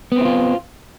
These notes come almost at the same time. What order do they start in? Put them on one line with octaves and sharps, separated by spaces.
B3 C4 E4 F4